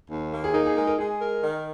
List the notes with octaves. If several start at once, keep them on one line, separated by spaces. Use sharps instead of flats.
D#2
A#3
G#4
D#4 A#4
G#4
G#3 A#4
A#4
G#3 G#4
A#4
D#3